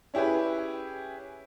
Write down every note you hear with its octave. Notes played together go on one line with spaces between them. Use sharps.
C#4 E4 G4 G#4 B4